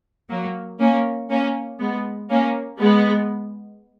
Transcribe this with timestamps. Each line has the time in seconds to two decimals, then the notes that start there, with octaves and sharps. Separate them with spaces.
0.29 F#3 A#3
0.80 A#3 C#4
1.30 A#3 C#4
1.80 G#3 B3
2.30 A#3 C#4
2.79 G#3 B3